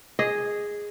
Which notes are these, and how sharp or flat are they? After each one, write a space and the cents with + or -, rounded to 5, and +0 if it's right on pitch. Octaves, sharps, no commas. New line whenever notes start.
G#4 -5 D#5 +0